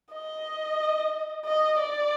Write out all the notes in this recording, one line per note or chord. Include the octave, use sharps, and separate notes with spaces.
D#5
D#5
D5